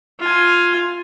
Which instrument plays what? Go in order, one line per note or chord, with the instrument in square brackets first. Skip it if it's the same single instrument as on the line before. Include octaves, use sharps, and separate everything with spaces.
[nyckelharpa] F4 G#5